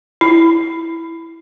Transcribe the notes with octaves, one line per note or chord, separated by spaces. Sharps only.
E4